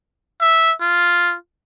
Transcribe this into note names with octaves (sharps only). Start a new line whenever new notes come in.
E5
F4